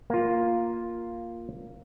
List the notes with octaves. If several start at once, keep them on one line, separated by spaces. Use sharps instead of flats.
A#3 F4